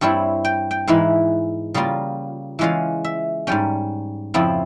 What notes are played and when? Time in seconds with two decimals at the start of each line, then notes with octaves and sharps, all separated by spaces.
0.01 G2 G3 C4 E4 C#5
0.45 G5
0.71 G5
0.87 G#2 E3 G#3 E4 F5
1.74 C#3 G3 A#3 F4
2.59 E3 G#3 C#4 F4 F5
3.05 E5
3.47 G#2 G3 C#4 G5
4.34 F2 C#3 F3 C4 E4